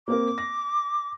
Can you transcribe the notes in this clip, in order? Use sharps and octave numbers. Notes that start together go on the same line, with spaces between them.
A#3 C4 A#4 D6
A#6